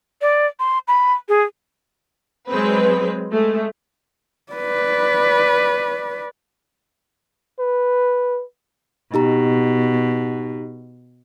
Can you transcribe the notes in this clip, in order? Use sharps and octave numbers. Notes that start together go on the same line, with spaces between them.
D5
C6
B5
G#4
F#3 G#3 C4 B4
G#3 A3
B4 D5
B4
B2 D#4 G4 A#5